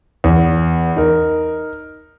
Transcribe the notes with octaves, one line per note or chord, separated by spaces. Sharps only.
E2
D#4 A#4